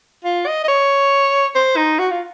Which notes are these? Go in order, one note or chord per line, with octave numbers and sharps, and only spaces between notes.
F4
D#5
D#5
C#5
C5
D#4
F#4
F4